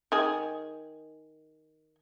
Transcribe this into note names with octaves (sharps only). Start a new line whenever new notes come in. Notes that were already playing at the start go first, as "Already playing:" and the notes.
D#3 G#4